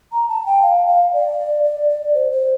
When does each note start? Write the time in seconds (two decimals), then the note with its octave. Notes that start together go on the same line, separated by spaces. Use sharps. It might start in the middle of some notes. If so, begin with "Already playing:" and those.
0.12 A#5
0.29 A5
0.46 G5
0.62 F5
0.87 F5
1.13 D5
1.64 D5
1.90 D5
2.14 C5
2.32 C5